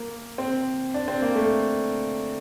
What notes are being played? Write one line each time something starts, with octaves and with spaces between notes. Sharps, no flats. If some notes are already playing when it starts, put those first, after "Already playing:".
Already playing: A#3
C4
D4
C4
A#3
A3